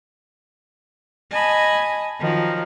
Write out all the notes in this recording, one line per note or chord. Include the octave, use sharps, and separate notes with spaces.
D#5 G#5 A5 B5
D#3 F3 F#3